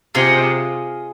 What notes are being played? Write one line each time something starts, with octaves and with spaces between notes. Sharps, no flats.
C3 F4 G#4 D#5